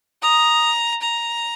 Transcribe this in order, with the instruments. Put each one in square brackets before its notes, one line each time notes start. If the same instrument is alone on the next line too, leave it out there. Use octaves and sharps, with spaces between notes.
[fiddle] A#5 [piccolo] D#6
[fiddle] A#5